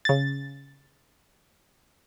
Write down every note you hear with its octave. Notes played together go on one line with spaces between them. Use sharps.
C#3 A6